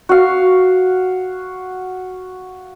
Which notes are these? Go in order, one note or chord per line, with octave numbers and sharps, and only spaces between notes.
F#4 F5